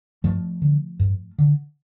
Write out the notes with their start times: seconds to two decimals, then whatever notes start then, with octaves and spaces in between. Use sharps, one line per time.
0.24 G2 F3 A3
0.62 D3
1.00 G2
1.39 D3